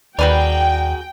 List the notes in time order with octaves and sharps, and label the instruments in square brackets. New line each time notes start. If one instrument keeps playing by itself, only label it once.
[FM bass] D#2 [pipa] G3 B4 D5 [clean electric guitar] F#4 G#4 A#4 [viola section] G5